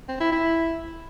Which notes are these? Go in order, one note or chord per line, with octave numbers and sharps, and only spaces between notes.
C4
E4
E4